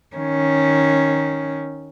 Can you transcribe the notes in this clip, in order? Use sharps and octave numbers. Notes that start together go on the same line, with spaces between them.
D#3 C#4